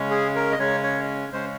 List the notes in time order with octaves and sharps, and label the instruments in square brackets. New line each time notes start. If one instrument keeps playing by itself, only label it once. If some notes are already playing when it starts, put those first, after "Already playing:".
Already playing: [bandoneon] C#3 G#3 C#4
G#4
A#4
D#5
C#3 G#3 C#4 C#5
C#5
C#3 G#3 C#4 C5